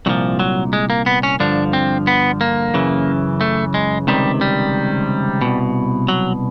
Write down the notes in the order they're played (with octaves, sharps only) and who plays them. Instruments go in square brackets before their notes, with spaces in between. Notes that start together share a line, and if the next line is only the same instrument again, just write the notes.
[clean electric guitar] C2 A#2 F3 F#3
F#3
G#3
A#3
B3
C#4
G2 D3 F3 D4
C4
B3
A#3
F#2 C#3 E3
A3
G#3
C#2 C3 D#3 G3
G3
C2 B2
F#3